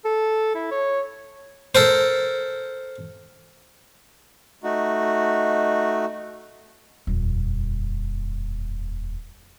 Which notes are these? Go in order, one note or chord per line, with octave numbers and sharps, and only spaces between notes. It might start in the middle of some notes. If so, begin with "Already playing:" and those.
A4
E4
C#5
A4 A#4 C5
A3 D#4 F#4
D#1 F2